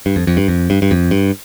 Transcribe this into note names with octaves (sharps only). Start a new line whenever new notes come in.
G2
F2
F2
G2
F2
G2
G2
F2
G2